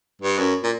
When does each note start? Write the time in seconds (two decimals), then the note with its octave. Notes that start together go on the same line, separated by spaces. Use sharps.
0.21 G2
0.38 F#2
0.63 A#2